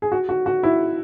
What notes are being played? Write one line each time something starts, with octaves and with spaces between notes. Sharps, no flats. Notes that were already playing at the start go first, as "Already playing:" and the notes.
G#4
F#4
F#4
F#4
E4